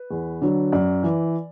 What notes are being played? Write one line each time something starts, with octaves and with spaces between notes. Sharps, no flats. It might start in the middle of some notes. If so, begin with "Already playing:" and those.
Already playing: B4
E2
D3 F#3
F#2 D5
E3